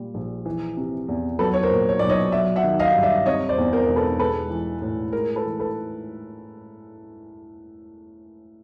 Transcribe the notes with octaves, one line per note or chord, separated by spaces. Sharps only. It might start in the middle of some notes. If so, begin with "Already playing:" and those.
Already playing: A#2 G3
A#1
E3
C3
E2
F#3 A4 B4
C#5
A#4 C5
A#2
C#5
B1 D5
C#5 D#5
F#3 D5 E5
E5 F#5
D#3
D#5 F5
G2
D5 E5
C3 C#5 D#5
C5 D5
E2
A#4 C5
E1
A4 B4
G#3 A4 B4
E3
A2
G#3 A#4
A4 B4
E3
A4 B4